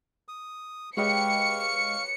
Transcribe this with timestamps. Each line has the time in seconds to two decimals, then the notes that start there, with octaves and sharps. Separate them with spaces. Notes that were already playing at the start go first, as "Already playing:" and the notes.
0.28 D#6
0.97 G#3 G4 B4 C#5 D#5 F5 C#6 C#7